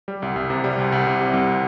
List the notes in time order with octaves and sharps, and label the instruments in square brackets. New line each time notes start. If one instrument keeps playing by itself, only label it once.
[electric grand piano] G3
C2
C2
C3
G3
C2
C2
C3
G3
C2